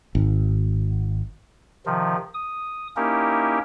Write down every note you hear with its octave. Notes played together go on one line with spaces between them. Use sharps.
G#1
C3 D#3 F3
D#6
A#3 C#4 D#4 E4 G4 A#4